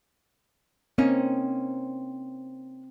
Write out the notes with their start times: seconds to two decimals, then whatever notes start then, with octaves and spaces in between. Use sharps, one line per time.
0.98 A#3 C4 C#4 D#4